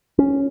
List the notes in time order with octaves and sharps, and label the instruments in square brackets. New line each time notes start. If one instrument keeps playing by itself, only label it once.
[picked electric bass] C#4